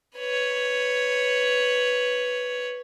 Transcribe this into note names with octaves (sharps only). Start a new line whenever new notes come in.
B4 C#5